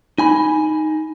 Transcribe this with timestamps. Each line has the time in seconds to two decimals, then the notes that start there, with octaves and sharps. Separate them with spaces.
0.18 D#4 G#5 B5